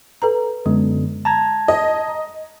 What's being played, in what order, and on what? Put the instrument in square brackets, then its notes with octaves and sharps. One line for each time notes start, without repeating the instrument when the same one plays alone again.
[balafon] A4 B4 A#5
[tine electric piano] F#2 D3 B3 [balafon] G#3
[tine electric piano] A5 A#5 G#6
[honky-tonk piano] D#5